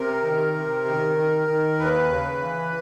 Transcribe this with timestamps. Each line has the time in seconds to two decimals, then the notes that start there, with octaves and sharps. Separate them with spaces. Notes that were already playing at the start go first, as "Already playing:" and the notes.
Already playing: C3 A#4
0.23 D#3
0.54 C3
0.85 D#3
1.17 D#3
1.47 D#3
1.79 D#2 B4
2.10 C#3
2.41 E3